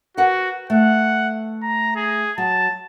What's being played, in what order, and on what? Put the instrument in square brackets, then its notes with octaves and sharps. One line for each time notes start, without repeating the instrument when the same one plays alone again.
[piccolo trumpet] F#4 [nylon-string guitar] A#4 B4 F#5
[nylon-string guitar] A3 [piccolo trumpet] F#5
[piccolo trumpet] A#5
G#4
[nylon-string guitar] F#3 [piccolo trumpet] A5